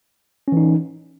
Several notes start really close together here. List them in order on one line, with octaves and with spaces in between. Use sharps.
C#4 E3 D#4